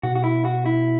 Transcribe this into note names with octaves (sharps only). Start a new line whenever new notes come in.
B2 F#4
F#4
E4
F#4
E4